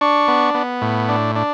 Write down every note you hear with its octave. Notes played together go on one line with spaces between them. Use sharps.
D4 C#6
B3
B3
A2
D4
D4